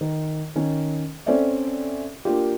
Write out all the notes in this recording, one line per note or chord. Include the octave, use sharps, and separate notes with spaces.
D#3
D#3 C#4
C4 C#4 A4 C5 D5 E5
A#3 D4 F4 G4